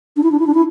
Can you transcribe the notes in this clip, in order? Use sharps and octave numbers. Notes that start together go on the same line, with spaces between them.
D4
E4
D4
E4
D4
E4